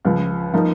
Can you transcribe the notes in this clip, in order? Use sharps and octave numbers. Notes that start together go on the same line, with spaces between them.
C#2 C#3 F3
F3 A#3 D#4